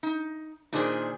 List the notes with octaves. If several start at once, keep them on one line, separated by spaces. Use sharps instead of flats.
D#4
A#2 D#3 D4 G#4 C5 G#5